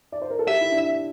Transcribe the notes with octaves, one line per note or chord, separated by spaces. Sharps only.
D5
C5
A#4
A4
G4 E5
E4
D4